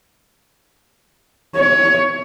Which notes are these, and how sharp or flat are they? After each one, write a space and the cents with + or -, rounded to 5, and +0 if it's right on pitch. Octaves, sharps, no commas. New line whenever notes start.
C#5 +20